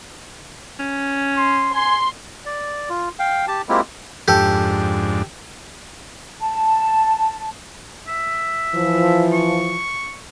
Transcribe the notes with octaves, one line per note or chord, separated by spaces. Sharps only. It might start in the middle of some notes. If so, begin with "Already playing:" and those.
C#4
C6
G#5 C6
D5
F4
F5 G5
G4 A5
G#3 A#3 C4 E4 F4 G4
F2 G#2 D4 G4 A4
A5
E5
E3 F3
C#6